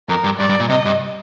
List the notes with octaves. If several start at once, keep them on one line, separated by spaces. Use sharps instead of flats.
F2 A#4
G2
G2 D5
G2
A#2
C3 D#5
G2